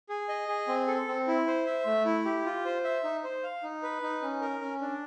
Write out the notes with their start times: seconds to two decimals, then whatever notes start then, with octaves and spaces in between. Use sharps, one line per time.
0.09 G#4
0.29 D#5
0.48 G#4
0.68 C4
0.88 A4
1.07 C4
1.27 E4
1.47 C5
1.66 E5
1.86 A3
2.05 E4
2.25 G4
2.45 F4
2.65 C5
2.84 E5
3.04 D#4
3.24 C5
3.43 F5
3.63 D#4
3.83 B4
4.02 D#4
4.22 C#4
4.41 A#4
4.61 C#4
4.81 D4